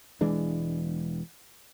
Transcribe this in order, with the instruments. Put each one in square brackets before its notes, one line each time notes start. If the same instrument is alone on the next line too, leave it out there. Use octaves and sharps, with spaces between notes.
[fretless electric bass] E1 E3 G#3 D4